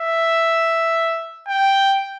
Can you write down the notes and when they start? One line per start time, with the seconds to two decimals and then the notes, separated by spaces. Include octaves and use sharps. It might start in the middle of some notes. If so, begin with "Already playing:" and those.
Already playing: E5
1.48 G5